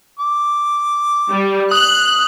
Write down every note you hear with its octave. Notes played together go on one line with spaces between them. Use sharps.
D6
G3
D#6 F#6 F#7